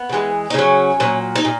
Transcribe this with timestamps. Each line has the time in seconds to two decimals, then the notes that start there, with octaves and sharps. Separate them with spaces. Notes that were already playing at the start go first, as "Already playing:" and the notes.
Already playing: B3
0.09 C#3
0.13 E3 G#3
0.50 D#4
0.54 C#3 F#3 C#4
1.00 A#2 F#3
1.36 D#4
1.45 A#2